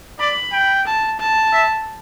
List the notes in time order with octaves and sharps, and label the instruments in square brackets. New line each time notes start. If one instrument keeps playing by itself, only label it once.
[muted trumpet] D5 [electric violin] B5
[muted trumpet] G5
[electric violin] A5
A5
[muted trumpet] E5